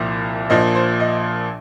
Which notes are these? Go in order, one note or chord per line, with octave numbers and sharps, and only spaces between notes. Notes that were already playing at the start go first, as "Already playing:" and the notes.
Already playing: C2 A#2 F3
A#1 A#2 F3 D#5
C5
D#5